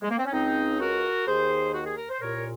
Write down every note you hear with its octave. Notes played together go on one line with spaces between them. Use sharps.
G#3
A#3
C4
C#4
C#2 C#3 C4 D#4
F#4 A#4
D#2 D#3 G#4 C5
F#4
G#4
A#4
C5
C2 A#2 A#4 C#5